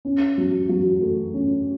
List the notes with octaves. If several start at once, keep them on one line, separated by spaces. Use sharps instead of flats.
C#4
F#3
F#3
A3
C#4